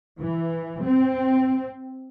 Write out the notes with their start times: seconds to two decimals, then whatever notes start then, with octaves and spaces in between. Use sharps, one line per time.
0.19 E3
0.83 C4